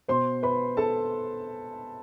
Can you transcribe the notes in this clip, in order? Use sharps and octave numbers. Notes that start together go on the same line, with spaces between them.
B2 C5 C6
B4 B5
A4 A5